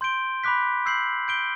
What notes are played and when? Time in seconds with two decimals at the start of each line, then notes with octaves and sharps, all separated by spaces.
0.01 C6 G6 D7 G7
0.44 B5 D6 F#6 B6
0.86 E6 G6 C7 F#7
1.28 G6 D7 G7